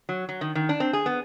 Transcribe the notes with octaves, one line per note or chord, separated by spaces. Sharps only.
F#3
F#3
D#3
D#3
D4
C4
G#4
B3